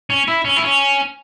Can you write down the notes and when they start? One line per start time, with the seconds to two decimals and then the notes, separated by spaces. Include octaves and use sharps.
0.10 C#4
0.28 E4
0.45 C#4
0.56 E4
0.63 C#4